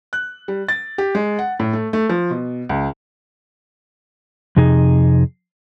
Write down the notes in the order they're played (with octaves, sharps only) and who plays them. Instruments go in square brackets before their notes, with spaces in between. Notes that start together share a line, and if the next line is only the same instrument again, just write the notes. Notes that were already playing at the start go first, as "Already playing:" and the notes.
[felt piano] F#6
G3
A6
G4
G#3
F#5
A2
A3
A3
F3
B2
C#2
[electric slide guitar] F2 C3 D#4 G#4